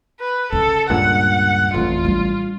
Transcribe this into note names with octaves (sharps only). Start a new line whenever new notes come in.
B4
C#3 A4
C#2 G2 A#2 F#5
A1 F2 E3 F4
G3 D4